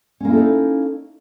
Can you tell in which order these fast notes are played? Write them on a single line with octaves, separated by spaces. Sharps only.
C#4 A#3 E4 A4 D#4